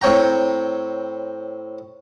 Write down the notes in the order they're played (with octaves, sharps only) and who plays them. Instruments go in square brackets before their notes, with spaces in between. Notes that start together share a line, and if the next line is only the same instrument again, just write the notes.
[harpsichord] A2 C4 C#5 G5 A#5